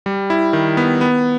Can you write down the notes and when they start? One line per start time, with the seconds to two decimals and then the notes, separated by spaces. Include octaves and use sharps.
0.06 G3
0.30 E4
0.53 D#3
0.77 B3
1.01 B3